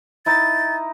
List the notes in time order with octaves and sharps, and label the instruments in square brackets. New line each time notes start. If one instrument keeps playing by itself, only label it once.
[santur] D#4 E4 [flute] A6